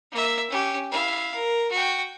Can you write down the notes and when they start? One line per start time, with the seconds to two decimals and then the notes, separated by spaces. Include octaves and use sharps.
0.12 A#3 E5
0.50 C#4 G4
0.91 E4 F5
1.35 A#4
1.71 F#4 G5